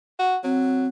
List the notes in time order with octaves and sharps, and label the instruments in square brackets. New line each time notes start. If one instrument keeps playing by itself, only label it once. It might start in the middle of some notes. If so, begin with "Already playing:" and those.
[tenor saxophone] F#4
[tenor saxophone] F#3 [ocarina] C4